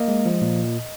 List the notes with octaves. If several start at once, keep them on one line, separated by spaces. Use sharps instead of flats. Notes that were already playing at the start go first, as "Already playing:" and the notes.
Already playing: A#3 D#5
G#3
F3
A#2